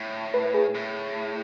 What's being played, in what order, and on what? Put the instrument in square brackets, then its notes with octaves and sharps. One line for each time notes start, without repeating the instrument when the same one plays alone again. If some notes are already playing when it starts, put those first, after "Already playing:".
Already playing: [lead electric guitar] A2
[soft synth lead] B4
G#4
[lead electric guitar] A2